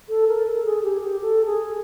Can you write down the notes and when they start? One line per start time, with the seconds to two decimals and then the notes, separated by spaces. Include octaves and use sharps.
0.09 A4
0.28 A#4
0.47 A4
0.65 G#4
0.83 G4
1.01 G4
1.21 A4
1.45 G#4